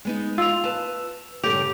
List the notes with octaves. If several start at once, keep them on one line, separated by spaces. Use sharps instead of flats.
G#3 B3 D#4
F4 E6 F7
B4 A5
G2 C#3 G4 A4 F7